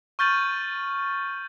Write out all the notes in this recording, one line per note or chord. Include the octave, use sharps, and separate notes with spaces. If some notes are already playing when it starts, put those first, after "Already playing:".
C#6 F6 G6 A6 D#7 F#7